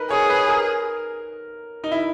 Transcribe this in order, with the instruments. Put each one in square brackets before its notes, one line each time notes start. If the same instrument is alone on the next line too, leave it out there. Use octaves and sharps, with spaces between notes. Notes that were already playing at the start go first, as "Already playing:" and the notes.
Already playing: [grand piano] D#4 A#4 B4
[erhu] G#4 [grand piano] C#5
[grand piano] B4
A#4
D#4
E4